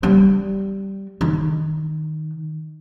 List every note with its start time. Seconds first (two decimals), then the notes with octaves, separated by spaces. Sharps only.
0.03 G3
1.21 D#3